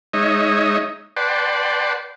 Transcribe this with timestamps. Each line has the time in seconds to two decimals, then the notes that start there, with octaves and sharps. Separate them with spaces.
0.13 G#3 D#4 C#5 D#5 E5
1.16 B4 D5 F#5 G5 A5 C6